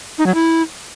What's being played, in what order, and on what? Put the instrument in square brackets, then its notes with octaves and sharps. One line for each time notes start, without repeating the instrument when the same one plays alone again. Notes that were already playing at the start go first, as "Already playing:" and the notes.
[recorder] D#4
F#3
E4